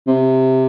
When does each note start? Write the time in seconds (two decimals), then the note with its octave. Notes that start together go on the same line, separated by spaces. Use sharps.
0.07 C3